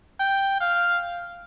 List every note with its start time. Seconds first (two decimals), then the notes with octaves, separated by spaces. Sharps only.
0.20 G5
0.61 F5